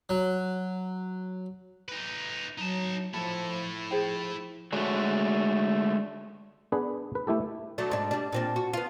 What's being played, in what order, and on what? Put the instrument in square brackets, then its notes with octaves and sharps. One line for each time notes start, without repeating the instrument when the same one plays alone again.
[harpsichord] F#3
[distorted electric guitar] D#4 B4
[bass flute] F#3 [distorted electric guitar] D#4 A5
[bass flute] F3 [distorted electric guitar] E4 A4 [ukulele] A5
[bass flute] F3 [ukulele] G#4 C5 G5
[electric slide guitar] D3 G#3 A3 F#4 C#5
[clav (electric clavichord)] B3 D4 G#4 B4
B4
A3 E4 G4 A4
[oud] F#3 A3 D4
G#2 D4
G3 D4
A#2 C4 D4
F#4
B3 F4